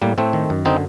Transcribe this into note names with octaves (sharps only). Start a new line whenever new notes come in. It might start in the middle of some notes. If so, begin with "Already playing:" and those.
A2 G3 A#3
A2 A3 C4
D#3
F#2
D3 C4 D#4